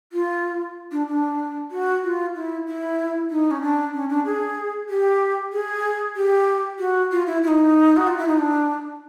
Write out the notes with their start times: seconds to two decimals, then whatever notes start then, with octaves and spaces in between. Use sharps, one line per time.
0.13 F4
0.92 D4
1.08 D4
1.71 F#4
2.04 F4
2.35 E4
2.67 E4
3.31 D#4
3.51 C#4
3.62 D4
3.94 C#4
4.09 D4
4.25 G#4
4.89 G4
5.53 G#4
6.16 G4
6.79 F#4
7.12 F4
7.27 E4
7.43 E4
7.48 D#4
7.97 F#4
8.07 F4
8.17 E4
8.28 D#4
8.38 D4